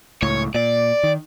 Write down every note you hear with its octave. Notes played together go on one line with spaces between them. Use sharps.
C#2 A2 C#5
A#2 D5
D#3